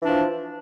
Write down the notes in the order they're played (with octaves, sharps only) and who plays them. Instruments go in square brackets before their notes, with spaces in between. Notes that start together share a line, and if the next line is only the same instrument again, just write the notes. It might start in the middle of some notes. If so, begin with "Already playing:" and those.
[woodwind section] E3
D4
F3